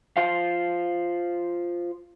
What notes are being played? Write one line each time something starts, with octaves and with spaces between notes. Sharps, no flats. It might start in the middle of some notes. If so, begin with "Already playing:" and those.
F4 C5 F5